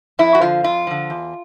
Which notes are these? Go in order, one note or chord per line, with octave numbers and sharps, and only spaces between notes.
F2 E4
F#4
D3 F3 F4
F2 F4
D3 F3
E2